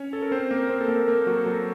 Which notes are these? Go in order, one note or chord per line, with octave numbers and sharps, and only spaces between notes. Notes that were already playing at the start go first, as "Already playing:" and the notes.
Already playing: C#4 C#5
A4
A#4
C4 C5
A#3 A#4
A#4
C4 C5
A4
A#3 A#4
A#3 A#4
F#3 F#4
A4
F#3 F#4